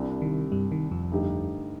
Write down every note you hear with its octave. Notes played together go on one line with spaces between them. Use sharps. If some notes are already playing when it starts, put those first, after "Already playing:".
Already playing: C2 C3 G3 D4
D#3
G2 G3
D#3
F2 F3
G2 D3 A3 D#4 G4